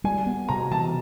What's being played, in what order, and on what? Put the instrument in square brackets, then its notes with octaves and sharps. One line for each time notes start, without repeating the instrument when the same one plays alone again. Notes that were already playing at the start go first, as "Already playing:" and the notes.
[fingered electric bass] G3 [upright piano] G#5
[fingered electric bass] B3
[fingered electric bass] C3 [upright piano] A#5
[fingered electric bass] E3 [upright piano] A5